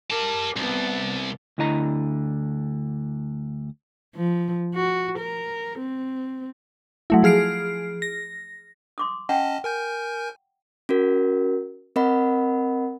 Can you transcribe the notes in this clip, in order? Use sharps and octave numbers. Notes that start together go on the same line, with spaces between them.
G4 A#4 A5
C2 B3 A5
D2 D3 E4 D#5 A#5
F3
F#4
A#4
C4
F#3 A3 E4
F3 G#4 F6 C7 D7
A#6
C6 D6 D#6
C#4 D#5 F#5 G5 A5
A#4 G#5 G6
C#4 F#4 A#4
C4 A#4 D#5 F#5 B5